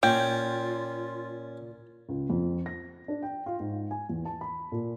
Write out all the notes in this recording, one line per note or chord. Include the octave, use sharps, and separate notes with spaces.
A#2 C#4 F4 G5
C#2
F2
A#6
D4
G5
F4
G#2
G#5
E2
A5
B5
A#2